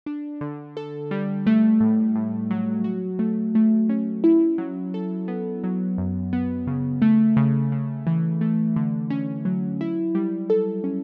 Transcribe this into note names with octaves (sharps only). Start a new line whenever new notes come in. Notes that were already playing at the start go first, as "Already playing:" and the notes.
D4
D3
A4
G3
A3
A2
A2
F#3
F#4
A3
A3
C#4
E4
F#3
A4
B3
F#3
F#2
B3
C#3
A3
C#3
C#3
E3
A3
D3
C#4
F#3
E4
G3
A4
C#4